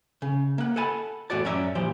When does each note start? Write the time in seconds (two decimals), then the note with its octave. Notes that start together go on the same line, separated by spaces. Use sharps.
0.22 C#3
0.58 A#3 F#5
0.76 A4 F#5 G#5 A5 B5
1.30 E2 A2 F#4 D5 A5
1.45 F#2 C#4 C#5 D5 E5 A#5
1.75 A#2 E3 F3 G4 C5